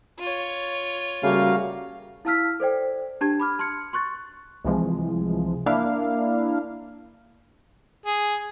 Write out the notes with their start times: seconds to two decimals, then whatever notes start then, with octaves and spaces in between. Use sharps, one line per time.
0.20 F4 C#5
1.23 C#3 G3 A3 A#3 F#4 F5
2.25 E4 F5 A5 E6 F6 B6
2.60 A4 C5 D5 G5
3.21 D4 G4 A5 G#6
3.40 B5 D6 F6
3.59 A5 C6 F6 G#6 C#7
3.93 C6 C#6 F#6 A6
4.65 C2 C3 E3 F3 G#3
5.66 A#3 D4 E4 F5
8.06 G#4